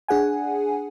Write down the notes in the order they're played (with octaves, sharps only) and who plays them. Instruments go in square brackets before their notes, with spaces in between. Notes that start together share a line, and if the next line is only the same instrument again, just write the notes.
[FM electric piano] D4 G#4 F#5 G#5